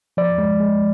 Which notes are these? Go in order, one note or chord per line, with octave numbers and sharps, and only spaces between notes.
F3 D5
G#3
G#3